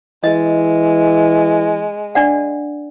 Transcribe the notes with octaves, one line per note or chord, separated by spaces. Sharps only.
E3 G#3 D#5
D4 D5 F#5